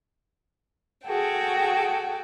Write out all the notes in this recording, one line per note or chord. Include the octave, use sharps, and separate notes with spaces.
F#4 G#4 A4 G5